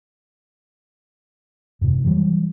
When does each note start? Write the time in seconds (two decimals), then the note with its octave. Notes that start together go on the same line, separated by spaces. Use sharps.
1.81 F#2 C3
2.04 E3 F#3 G3